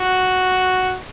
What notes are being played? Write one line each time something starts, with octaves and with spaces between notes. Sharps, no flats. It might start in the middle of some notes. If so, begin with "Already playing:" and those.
Already playing: F#4